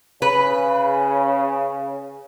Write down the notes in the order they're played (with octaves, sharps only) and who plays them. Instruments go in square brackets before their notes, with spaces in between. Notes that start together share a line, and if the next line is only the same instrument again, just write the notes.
[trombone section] C#3 [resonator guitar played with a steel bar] B4